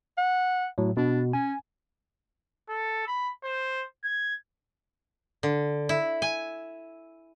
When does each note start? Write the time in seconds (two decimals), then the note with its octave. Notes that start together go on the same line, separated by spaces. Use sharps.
0.17 F#5
0.78 A2 F#3
0.97 B2 D4
1.33 C#4 G#5
2.69 A4
3.07 B5
3.44 C5
4.04 G#6
5.43 D3
5.89 E4
6.22 G#5